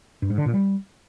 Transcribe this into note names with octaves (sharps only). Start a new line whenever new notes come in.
G2
G#2
D3
A#2
G3